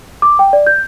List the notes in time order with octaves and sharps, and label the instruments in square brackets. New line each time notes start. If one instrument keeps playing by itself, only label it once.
[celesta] D6
G5
D5
G6